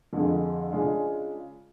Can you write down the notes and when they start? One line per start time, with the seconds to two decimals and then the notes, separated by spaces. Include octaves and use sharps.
0.13 F2 D3 G#3
0.71 C#3 G#3 D4 F4